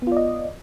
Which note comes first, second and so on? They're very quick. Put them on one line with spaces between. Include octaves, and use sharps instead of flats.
B3 F4 D5 D#5